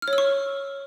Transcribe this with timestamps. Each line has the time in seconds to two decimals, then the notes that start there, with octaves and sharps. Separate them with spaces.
0.02 F6
0.08 C#5
0.13 E6
0.18 C#6